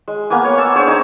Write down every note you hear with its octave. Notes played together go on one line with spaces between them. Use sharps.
G#3
A#3 B3 G#5 D6
C#5
C#5 A5 E6
D4 G#4 C5 C#5
D#4 G#5 D6